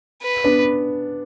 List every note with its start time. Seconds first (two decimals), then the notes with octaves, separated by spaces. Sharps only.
0.22 B4
0.44 B3 D4